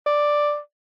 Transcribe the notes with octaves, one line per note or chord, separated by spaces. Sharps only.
D5